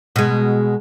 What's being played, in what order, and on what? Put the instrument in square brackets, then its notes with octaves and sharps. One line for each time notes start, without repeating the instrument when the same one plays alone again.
[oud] B2 G#3